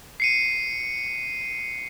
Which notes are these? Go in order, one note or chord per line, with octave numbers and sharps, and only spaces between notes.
C7 C#7 D#7